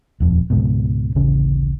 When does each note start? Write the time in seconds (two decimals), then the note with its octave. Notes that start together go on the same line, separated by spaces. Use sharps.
0.20 D#1 F2
0.50 C#2 G#2 B2
1.15 D1 A1 C#3 C#4